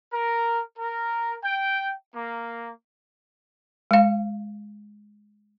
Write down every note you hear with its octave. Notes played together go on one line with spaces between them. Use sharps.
A#4
A#4
G5
A#3
G#3 F5